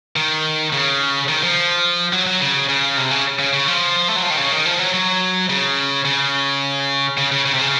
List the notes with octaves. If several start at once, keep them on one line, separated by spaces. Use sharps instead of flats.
D#3
C#3
D#3
F3
F#3
F#3
C#3
C#3
C3
C#3
C#3
C#3
F3
A3
F#3
F3
D#3
C#3
D#3
F3
F#3
F#3
C#3
C#3
C#3
C#3
C#3
C3
C#3